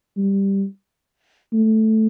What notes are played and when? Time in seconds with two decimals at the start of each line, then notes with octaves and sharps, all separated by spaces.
0.17 G3
1.53 A3